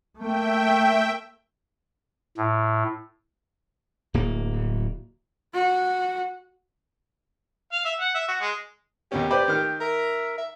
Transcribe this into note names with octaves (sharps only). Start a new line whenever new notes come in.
A3 A#3 E5 G5
A2
D1 A#3
F#4
F5
E5
F#5
E5
F#4
G#3
D#2 B2 C#4 G4
B4 C5 D5 G5
D#3 F6
A#4 E5
E5